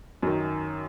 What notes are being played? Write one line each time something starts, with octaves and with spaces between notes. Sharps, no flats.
F#2 D#3